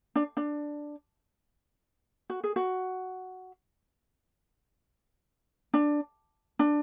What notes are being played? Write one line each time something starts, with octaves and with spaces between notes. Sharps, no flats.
D4
D4
F#4
G#4
F#4
D4
D4